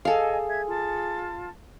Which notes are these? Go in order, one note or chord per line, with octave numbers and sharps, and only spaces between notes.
G#4 A4 D#5 F5 G#5
E5 G#6
F4 A5